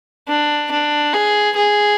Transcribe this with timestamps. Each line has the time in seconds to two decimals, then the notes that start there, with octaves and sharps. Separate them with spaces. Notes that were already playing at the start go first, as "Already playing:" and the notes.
0.28 D4
0.71 D4
1.13 G#4
1.56 G#4